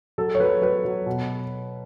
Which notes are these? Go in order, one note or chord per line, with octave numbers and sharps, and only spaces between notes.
F#3 A4
C#5
F#3 B4
F#3 B4
F#3
B2